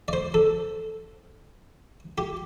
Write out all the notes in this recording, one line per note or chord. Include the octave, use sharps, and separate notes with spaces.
D5
C5
A4
G4